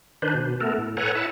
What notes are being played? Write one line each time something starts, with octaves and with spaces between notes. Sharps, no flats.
D#3 D4 B4 C5
B2
A3 B3 A4 A#4
A2
A4 B4 C#5 F#5 G#5 A#5
E4 E5 F#5 A5